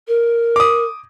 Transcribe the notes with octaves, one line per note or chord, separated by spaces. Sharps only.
A#4
D6 D#6